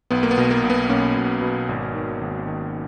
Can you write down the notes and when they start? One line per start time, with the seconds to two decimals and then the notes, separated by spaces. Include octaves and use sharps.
0.10 B1 B3
0.23 A#3
0.31 B3
0.38 B2
0.51 A#3
0.64 B1
0.70 B3
0.89 B1 A#3 C#4
1.17 B1
1.42 B2
1.69 G#1
1.95 D#3
2.21 G#1
2.47 D#3